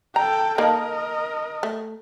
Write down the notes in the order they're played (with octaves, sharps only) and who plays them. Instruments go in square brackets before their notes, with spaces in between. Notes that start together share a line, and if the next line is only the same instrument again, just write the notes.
[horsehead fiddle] A4 G5 [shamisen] A#5
[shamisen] D#3 A#3 [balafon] A4 F5 A5 [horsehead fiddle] A#4 D#5
[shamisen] A3